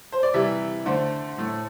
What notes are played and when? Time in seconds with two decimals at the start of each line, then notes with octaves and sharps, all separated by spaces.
0.12 C5
0.23 D5
0.34 C3 E3 G3 E5
0.86 D3 A3 C5
1.38 A2 A3